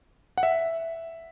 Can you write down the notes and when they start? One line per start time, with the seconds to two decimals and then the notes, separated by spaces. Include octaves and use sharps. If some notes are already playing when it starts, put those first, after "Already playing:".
0.38 F#5
0.43 E5